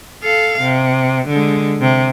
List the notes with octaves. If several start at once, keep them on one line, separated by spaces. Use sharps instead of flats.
A4 F5
C3
D3 G#3
C3